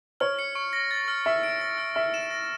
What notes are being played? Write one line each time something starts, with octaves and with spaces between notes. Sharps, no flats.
C#5 F6
C#7
C#6
A#6
A6
F6
E5 F6
D7
A#6
F6
E5 F6
E7
A#6